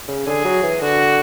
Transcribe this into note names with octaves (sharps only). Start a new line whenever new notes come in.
C#3
D3 G#4
F#3
E3
D3 F#4